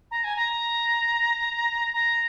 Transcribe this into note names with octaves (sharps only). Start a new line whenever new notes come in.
A#5
G#5
A#5
A#5